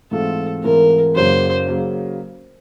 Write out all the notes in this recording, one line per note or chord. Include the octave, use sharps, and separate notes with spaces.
G#2 E3 A3 C4 F4 A4
G#2 E3 A3 C4 F4 A#4
F#1 F#2 C#3 F#3 A#3 C5
C#3 F#3 A#3